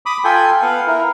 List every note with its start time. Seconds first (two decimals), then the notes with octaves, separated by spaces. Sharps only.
0.06 B5 D6 D#6
0.24 F4 A4 G5 G#5
0.62 B3 F5 F#5
0.87 E4 A#4